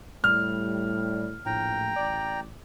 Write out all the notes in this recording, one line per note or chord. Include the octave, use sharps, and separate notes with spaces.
A2 G3 F6
A#1 A2 G5 A#5
A1 D5